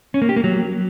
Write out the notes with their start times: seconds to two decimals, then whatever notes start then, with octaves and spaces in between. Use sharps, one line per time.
0.14 C#4
0.22 A#3
0.29 G4
0.36 A#3
0.44 F#3